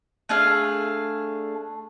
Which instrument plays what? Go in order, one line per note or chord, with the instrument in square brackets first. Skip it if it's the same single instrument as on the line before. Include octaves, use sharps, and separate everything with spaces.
[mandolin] A3 D4 G#4 F5